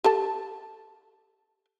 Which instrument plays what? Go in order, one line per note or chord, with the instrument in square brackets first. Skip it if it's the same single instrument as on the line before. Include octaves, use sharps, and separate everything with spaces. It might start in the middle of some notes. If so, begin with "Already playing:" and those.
[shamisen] G4 A4 A5